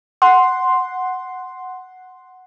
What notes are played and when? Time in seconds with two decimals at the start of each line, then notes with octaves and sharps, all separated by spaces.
0.22 F#5 C6